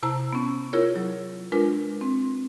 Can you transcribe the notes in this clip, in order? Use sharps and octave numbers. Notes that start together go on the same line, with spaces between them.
C3 E4 C5 A5 A#5
B3 C#4
E4 F4 G#4 A#4 C#5
F#3
G#3 D4 F4 A#4 B4
C4